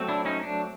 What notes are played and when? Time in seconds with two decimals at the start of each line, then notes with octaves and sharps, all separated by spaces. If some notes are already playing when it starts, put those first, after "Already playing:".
Already playing: F#3 A3 C4
0.08 D4 E4
0.25 C#4 D#4
0.43 D4